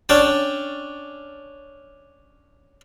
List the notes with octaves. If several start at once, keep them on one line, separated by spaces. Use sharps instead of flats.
C#4 D4 G5 A5